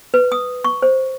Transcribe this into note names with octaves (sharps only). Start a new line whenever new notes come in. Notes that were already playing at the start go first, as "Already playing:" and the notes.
B4
D#6
C#6
C5